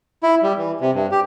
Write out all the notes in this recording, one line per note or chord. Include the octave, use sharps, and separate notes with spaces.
E4
G3
E3
C3
G2
G4